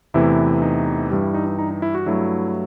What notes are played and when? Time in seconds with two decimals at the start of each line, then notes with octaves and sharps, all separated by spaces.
0.14 E2 C3 E3 A3 E4
0.62 D#4
1.11 G2 E3 G3
1.23 E4
1.34 D#4
1.47 D#4
1.59 D#4
1.71 D#4
1.82 E4
1.95 F#4
2.06 G2 F#3 A3 E4